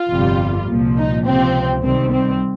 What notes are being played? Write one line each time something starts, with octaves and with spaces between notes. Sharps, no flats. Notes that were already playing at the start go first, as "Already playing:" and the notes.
Already playing: F4
G1 F2 C3 G3
C2 A#2 F3
D#4
C#2 C3 F3 C4
C2 C3 D#3 G3 C4
C4